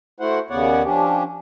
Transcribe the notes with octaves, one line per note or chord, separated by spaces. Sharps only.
A3 E4 F#4 C5 F#5
D#2 C#3 B3 C#5 D5 F#5
F3 C#4 D4 G4